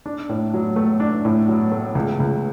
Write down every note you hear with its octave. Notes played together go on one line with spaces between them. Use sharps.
D4
A2
F#3
A3
D4
A2
F#3
A3
C#2
C#2